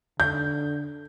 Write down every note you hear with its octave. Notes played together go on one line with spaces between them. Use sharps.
D3 G6